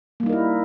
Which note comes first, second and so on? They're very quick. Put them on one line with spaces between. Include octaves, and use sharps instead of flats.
A#3 G3 D#4 A#4 E4